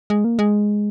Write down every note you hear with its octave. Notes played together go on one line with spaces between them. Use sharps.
G#3
A#3
G#3